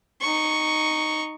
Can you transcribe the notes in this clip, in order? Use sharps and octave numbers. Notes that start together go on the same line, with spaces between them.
D#4 C#6